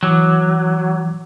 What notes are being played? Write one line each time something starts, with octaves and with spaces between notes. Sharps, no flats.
E3 F#3 D6